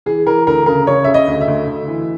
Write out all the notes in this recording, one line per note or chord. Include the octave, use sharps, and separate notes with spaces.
E3 G#4
E3 A#4
D2 A#4
C#3 A#4
C#3 C#5
C#3 E5
D#5
D2
E5
D2
D2
E3